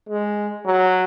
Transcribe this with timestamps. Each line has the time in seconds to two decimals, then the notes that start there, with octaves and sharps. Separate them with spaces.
0.09 G#3
0.65 F#3